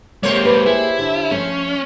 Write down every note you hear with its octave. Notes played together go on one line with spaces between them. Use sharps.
G#3 A#3 G4 C5 C#5
B4
A#3 E4 G#4
D3
F3 A3 C#4